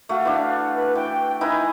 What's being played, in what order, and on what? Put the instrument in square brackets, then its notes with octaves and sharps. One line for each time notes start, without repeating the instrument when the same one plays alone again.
[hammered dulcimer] A3 F#4 [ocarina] F5
[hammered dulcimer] E3 D4
[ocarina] B4
[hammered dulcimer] E3 [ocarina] G5
[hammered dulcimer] D#4 E4 B4 [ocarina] G#5